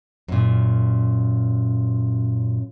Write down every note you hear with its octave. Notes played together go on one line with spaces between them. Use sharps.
F#2 A#2